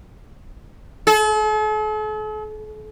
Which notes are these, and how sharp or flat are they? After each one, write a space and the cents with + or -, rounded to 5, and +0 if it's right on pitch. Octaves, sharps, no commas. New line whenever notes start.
A4 -45